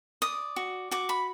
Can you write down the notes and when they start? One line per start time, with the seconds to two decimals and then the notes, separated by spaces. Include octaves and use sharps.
0.22 D5 D#6
0.56 F#4
0.91 F#4 D6
1.09 B5